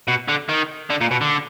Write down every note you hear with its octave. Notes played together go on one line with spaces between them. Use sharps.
B2
D3
D#3
D3
A#2
B2
D3